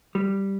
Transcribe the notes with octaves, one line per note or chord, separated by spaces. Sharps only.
G3